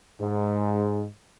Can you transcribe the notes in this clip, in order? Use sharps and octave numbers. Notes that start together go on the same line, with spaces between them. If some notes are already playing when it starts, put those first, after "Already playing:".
G#2